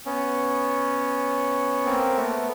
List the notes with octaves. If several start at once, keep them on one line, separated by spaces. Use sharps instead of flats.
B3 C#4
A#3 C4
A3 B3